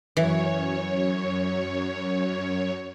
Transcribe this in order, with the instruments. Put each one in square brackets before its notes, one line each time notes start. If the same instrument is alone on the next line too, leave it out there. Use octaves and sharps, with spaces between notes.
[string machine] F#2 C#5 [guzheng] E3